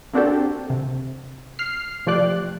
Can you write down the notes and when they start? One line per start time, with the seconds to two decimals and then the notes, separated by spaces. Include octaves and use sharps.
0.13 A#3 C4 D4 F#4 G4 A4
0.70 C3
1.59 F6 C7
2.06 C3 F3 A3 G4 D5 F#6